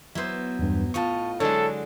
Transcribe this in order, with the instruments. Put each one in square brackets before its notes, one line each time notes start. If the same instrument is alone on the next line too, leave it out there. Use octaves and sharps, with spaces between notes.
[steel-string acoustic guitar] F#3 B3 [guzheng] E4 C5
[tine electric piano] E2 G2
[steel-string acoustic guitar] A2 F4 D#5 [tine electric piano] A5 C#6
[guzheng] D3 F#3 G#3 [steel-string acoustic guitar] E4 [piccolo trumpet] A4 [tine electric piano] C#5